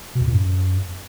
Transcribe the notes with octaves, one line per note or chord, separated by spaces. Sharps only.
B2
E2
A#2
F#2